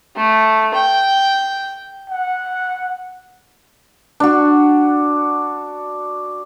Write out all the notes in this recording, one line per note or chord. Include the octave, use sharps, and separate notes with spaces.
A3
G5
F#5
D4 F#4